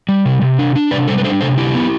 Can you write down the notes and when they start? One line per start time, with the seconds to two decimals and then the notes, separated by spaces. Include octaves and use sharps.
0.09 G3
0.26 C3
0.42 C3
0.59 D4
0.76 D4
0.91 C3 B4 D5
1.08 G3 A4 C5
1.18 B4
1.24 D4 A4 C5
1.41 C3 A4 C5
1.57 D3 E4 G4
1.74 B3